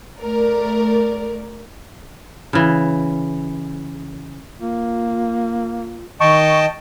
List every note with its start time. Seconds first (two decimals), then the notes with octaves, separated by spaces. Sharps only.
0.22 A3 A#4 D5
2.53 C#3 E3
4.60 A#3 F4
6.20 D#3 D#5 G5 A5 C#6